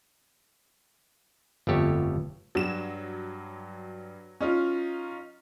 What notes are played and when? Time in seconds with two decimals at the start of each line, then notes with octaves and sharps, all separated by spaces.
1.67 G1 F2 A3 G4 C#5
2.55 G2 F#3 E7
4.41 C#4 D#4 F4